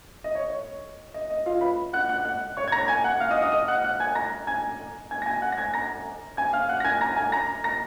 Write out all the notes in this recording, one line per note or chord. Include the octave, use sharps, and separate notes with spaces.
D#5
C#5
C#5
D#5
D#5
F4 F5
B4 B5
F#5 F#6
F#5 F#6
F#5 F#6
C#5 C#6
G#6
A#5 A#6
G#5 G#6
F#5 F#6
F5 F6
D#5 D#6
D#5 D#6
D#5 D#6
F#5 F#6
F#5 F#6
G#5 G#6
A#5 A#6
G#5 G#6
G#5 G#6
A#6
G#5 G#6
F#5 F#6
A#6
G#5 G#6
A#5 A#6
G#5 G#6
F5 F6
F#5 F#6
A#6
G#5 G#6
A#5 A#6
G#5 G#6
A#5 A#6
A#5 A#6